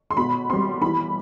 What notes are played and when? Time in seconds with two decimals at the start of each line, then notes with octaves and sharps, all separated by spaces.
0.11 C6
0.17 B2 B5
0.50 G3 C4 C6
0.81 E3 B5